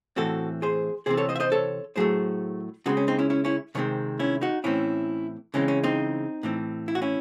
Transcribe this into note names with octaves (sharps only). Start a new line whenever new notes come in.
A2 E3 C4 F#4 A4
G#4 C5
C3 E3 C4 G#4 C5
A4 C#5
C5 D#5
E5
C5 D#5
A4 C#5
A2 F#3 A3 G#4 C5
C#3 G#3 C4 D#4 F#4
C#4
C4 D#4
C#4 E4
C#4 E4
C#4 E4
C3 D#3 G#3 C4 C#4
C#4 E4
D#4 F#4
A2 E3 C4 C#4 E4
C#3 E3 G#3 C4 C#4
C#4
C4 D#4
A2 E3 C4
E4
F#4
C#4 E4